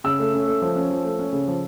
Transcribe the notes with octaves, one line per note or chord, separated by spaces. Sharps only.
C#3 E6
A3
C#4
A3
F3
C#4
F3
A3
C#4
C#3
F3